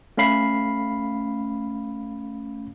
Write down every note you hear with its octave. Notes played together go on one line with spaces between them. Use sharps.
A3 C#4 F5 B5 C7